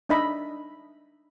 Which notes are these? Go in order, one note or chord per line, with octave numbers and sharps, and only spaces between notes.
D4 D#4 D#5 E5 B5